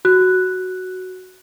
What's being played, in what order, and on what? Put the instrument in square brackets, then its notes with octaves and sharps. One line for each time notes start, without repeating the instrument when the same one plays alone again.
[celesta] F#4 F#6